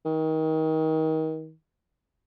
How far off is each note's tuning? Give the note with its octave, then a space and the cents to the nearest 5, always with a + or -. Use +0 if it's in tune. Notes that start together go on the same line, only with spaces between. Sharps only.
D#3 +30